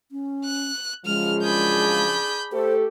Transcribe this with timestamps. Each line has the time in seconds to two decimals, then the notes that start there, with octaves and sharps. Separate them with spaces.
0.12 C#4
0.45 F#6
1.06 F#2 C#3 F3 G#3 F6
1.43 D4 G#4 B5 G6
2.53 A3 G4 A4 C5